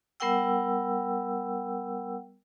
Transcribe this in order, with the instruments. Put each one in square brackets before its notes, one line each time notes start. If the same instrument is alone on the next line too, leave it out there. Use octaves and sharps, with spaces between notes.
[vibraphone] G3 B3 A#4 F#5 G5 E6